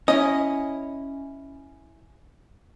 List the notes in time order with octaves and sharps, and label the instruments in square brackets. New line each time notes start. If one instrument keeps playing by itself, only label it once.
[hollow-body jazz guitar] C#4 E4 [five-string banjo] D#5